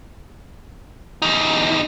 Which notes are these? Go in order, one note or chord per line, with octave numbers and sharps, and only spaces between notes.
E2 D#4